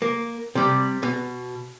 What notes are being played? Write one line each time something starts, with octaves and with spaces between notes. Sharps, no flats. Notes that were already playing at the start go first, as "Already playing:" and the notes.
A#3
C3 G3
B2